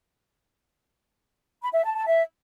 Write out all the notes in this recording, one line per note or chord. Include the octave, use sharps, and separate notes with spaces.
B5
E5
A5
A5
E5